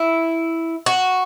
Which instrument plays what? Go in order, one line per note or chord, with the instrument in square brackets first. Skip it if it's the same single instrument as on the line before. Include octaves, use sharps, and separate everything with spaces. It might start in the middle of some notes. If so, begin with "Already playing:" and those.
Already playing: [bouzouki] E4
F#4